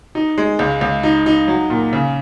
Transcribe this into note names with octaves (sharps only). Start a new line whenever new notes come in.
D#4
G#3
C#2
C#2
D#4
D#4
F#3
A#2
C#3